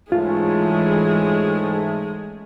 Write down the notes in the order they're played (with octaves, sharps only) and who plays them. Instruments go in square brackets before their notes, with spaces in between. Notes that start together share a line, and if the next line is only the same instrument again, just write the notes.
[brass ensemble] G#2 A3 C#4 [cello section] E3 [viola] G#3 G#4 [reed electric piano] F4